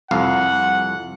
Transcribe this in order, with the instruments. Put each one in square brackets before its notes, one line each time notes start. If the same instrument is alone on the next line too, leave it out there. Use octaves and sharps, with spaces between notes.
[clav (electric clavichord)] C2 F2 F5 [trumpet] F#5